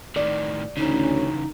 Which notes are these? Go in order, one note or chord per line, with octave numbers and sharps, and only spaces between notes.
A2 D#3 D5
D2 C#3 E3 C#4 D#4